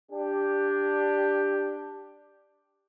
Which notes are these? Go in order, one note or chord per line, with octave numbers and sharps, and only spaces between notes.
D4 G4